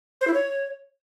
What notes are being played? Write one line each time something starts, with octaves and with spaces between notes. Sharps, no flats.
C5
E4
C#5